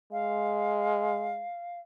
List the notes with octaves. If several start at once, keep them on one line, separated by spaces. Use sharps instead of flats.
G#3 F5